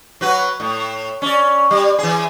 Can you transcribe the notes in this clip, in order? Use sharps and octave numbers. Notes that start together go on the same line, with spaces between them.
F#3 F#4 B4
A2
C#4 D5
G3
E3 G#4